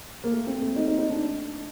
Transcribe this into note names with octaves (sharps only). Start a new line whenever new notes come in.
A#3
A3
C4
A3
D#4
D#4
D#4
D4